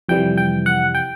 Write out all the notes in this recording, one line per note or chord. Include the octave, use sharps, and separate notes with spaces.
F2 C3 E3 G3 G5
G5
F#5
G5